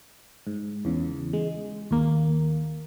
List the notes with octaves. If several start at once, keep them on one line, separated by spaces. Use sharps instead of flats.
G#2
E2 C#3
G#3
D#2 A#3